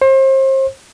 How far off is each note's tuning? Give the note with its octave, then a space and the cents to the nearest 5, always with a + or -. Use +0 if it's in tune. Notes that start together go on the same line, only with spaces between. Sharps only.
C5 +35